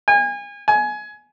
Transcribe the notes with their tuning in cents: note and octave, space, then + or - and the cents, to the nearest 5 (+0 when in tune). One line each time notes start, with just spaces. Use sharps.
G#5 -35
G#5 +20